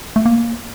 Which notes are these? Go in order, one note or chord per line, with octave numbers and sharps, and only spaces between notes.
A3
A#3